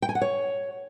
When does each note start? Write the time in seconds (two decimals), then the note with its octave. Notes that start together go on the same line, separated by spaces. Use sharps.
0.02 G5
0.09 G#5
0.15 F#5
0.22 C#5